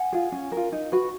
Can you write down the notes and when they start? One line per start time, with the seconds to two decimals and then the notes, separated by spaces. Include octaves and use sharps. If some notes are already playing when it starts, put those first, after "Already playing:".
Already playing: F#5 G#5
0.12 F4 G#4
0.32 C#4
0.52 A#4
0.57 F4
0.72 D#4
0.92 F#4 B4